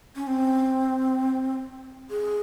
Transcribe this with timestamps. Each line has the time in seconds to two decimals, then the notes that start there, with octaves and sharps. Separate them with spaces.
0.16 C#4
0.27 C4
2.10 G#4